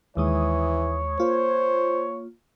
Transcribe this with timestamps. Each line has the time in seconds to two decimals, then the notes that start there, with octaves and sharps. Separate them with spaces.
0.17 D#2 E3 G#3 C#5 D#6
1.19 A#3 F4 C5